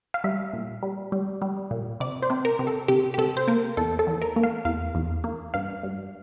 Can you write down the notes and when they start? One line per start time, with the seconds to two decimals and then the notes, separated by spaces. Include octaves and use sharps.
0.14 F5
0.24 G3 E5
0.53 A#2
0.83 G3
1.12 G3
1.42 G3
1.71 A#2
2.00 C3 D5
2.22 C5
2.30 C3
2.45 A#4
2.59 C3
2.67 A4
2.88 C3 G4
3.14 G4
3.18 C3 A4
3.37 C5
3.48 A#3 A#4
3.77 E2 A4
3.99 A4
4.07 E2
4.22 A#4
4.36 A#3
4.43 F5
4.65 E2 F5
4.95 E2
5.24 A#3
5.54 G2 F5
5.83 G2